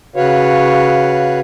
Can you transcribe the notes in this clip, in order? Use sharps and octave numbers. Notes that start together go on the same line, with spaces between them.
C#3 F#4 B4 C#5 F5